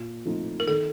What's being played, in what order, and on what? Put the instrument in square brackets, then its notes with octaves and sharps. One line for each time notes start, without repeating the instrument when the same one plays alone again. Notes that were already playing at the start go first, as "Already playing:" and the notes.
Already playing: [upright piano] A#2
F3 A3 C4 D#4
[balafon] A#4
[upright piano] D#3 [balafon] A4